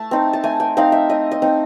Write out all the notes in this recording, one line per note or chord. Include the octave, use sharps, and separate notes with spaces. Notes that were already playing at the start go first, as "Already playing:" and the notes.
Already playing: A3 A5
C4 D#4
A5
A3 G#5
G5
C4 D#4 F5
E5
A3 D#5
D#5
C4 D#4